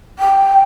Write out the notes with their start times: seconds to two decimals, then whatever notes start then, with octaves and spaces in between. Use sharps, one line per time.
0.19 G5